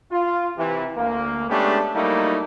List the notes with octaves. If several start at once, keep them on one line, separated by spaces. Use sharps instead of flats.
F4
C3 E3
D2 A#3
G#3 A3 B3 C#4 D4 G4
F#3 G3 A3 A#3 D#4 E4